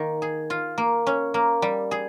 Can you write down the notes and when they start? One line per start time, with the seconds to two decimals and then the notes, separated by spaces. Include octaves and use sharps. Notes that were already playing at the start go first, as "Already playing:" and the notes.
Already playing: D#3 A#3
0.22 G#4
0.50 F4
0.78 A#3
1.07 C#4
1.34 A#3
1.62 G3
1.91 G#4